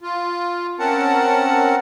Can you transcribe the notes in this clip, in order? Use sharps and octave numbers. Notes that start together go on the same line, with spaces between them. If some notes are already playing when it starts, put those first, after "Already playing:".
F4
C4 C#4 A#4 F#5 A5